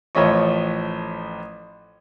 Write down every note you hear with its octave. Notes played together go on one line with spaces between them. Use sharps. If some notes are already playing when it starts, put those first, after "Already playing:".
A1 F3 A3 C#5 D#5 C#6